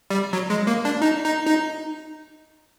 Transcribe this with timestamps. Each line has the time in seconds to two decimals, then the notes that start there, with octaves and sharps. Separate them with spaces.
0.10 G3
0.33 F#3
0.50 G#3
0.67 A#3
0.85 D4
1.02 D#4
1.25 D#4
1.47 D#4